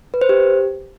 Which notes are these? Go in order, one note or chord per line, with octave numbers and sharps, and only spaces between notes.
B4
C5
G4